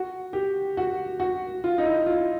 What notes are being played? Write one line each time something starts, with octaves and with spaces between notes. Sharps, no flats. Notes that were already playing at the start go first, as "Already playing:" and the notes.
Already playing: F#4
G4
F#4
F#4
F4
D#4
E4
F4